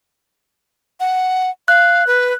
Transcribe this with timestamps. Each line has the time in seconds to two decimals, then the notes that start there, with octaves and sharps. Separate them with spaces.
1.00 F#5
1.68 F5 F#6
2.07 B4